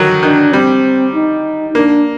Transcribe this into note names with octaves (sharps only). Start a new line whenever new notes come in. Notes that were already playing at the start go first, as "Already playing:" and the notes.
Already playing: D3 D#3 F#3
D#3 D4
G3 C4
D#4
A#3 D4